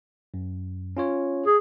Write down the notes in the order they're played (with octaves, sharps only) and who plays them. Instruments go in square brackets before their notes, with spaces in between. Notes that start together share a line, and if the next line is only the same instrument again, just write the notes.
[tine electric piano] F#2
C#4 F4 C#5
[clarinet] G#4